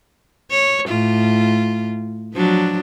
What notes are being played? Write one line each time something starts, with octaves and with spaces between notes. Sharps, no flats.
C#5
A2 F4
F3 F#3 D4